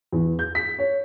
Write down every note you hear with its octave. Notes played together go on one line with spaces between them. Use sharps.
E2
G6
B6
C#5